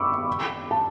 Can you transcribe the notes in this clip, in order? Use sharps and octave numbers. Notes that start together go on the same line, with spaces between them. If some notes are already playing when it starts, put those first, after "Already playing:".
Already playing: B5 C#6 D6 E6
A5